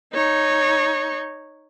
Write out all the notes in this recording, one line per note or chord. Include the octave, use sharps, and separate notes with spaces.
D#4 C#5